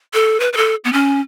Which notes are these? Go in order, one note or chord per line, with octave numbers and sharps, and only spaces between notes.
A4
B4
B4
A4
B3
C#4